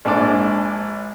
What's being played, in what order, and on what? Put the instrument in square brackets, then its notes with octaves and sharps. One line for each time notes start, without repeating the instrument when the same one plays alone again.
[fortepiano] A#1 G#2 D4 D5